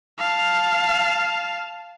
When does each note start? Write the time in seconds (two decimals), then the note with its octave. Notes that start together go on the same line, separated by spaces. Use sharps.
0.19 F5 A5